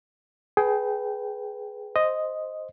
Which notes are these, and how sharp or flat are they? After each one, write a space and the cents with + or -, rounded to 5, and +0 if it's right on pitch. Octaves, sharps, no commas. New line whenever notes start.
G#4 +15 B4 +0 G5 -15
C5 +0 D#5 +0